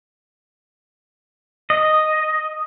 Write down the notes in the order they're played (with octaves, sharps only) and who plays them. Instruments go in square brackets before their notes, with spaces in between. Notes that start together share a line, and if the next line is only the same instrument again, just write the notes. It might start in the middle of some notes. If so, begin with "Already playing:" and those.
[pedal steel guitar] D#5